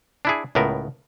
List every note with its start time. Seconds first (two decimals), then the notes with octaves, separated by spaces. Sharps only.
0.25 D4 E4 G#4
0.55 C#2 A2 B3 A#4